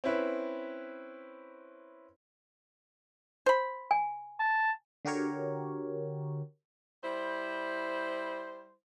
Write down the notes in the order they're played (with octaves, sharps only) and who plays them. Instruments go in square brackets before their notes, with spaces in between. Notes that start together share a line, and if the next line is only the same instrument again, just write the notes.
[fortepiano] C4 C#4 E4 B4
[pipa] C5 B5
[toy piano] G#5
[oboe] A5
[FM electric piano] D3 F#4 G4 A#4 C#5
[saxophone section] G3 E4 C5